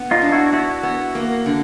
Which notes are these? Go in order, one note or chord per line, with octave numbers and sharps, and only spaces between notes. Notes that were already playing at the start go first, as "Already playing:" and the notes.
Already playing: B3
D#4 F4
D4
E4 F#4
B3 E4 F#4
B3
A#3
D3